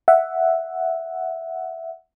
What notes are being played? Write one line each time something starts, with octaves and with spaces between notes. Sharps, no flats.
E5 F#5